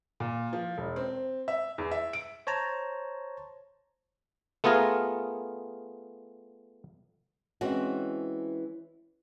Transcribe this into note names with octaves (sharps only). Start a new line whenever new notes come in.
A#2
F3
E1
C4
E5
E2
E5
D7
C5 C#5 A5 A#5
A3 B3 F4 G#4 A#4
E3 G#3 C4 C#4 F#4